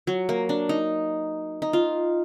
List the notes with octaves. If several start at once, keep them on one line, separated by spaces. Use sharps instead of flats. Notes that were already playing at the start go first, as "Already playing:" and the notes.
F#3
A#3
D4
D#4
D#4
F4